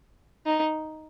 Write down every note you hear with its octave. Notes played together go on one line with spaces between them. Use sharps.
D#4